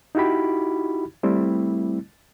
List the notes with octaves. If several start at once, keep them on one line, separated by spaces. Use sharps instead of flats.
D#4 E4 F#4 G4 B5
G3 A3 C4 E4